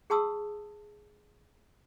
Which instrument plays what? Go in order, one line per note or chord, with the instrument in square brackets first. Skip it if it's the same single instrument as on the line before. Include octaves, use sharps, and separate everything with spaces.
[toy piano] G#4 F#5 A5 C6 D#6 E6